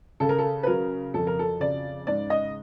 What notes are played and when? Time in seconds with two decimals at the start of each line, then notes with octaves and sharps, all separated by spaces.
0.20 C#3 A4
0.29 A#4
0.38 A4
0.63 B4
0.67 F#3 A#4
1.14 F2 A4
1.27 A#4
1.39 A4
1.60 C#3 D5
2.07 G#2 D5
2.30 D#5